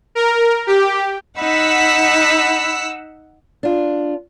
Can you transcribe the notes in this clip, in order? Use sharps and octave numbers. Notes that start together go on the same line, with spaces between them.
A#4
G4
D#4 F#5 B5 E6 B6
D4 F4